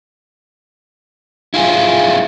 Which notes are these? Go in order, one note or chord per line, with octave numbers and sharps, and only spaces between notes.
E4 F4 G#4